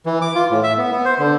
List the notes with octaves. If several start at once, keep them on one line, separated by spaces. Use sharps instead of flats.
E3
D6
F4
A2
E5
B3
B3
C5
D3